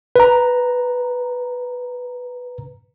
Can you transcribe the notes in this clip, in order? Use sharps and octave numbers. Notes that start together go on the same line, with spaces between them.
B4 A#5